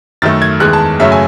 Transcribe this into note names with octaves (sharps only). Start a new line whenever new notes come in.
F#2 D#3 A3 A6
G#6
E2 D#3 G#3 F#6
A5
F#2 C#3 F#3 A3 E5
G#5